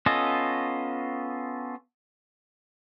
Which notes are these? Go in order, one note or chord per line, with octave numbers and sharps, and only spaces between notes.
B3 C#4 F4 A4 D#5